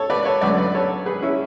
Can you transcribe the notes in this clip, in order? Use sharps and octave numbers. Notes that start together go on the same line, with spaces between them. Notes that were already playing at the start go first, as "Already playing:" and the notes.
Already playing: A4 C#5
B4 D5
A4 C#5
F#2 D3 F#3 A3 B4 D5
B4 D5
A4 C#5
G#4 B4
C#4 E4